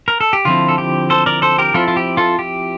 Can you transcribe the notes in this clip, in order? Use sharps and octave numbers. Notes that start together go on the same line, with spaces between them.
A#4
A4
G4
D3 F3 C4 E4 F4
A4
G4
A4 C5
A#4 D5
A4 C5
G4 A#4
F3 C4 E4 F4 A4
F4
G4
F4 A4
G4